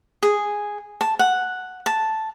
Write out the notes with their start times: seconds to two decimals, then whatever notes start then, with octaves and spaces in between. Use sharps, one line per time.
0.23 G#4
1.01 A5
1.19 F#5
1.86 A5